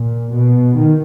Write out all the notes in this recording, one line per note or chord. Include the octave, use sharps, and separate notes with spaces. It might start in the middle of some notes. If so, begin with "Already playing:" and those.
Already playing: A#2
B2
D#3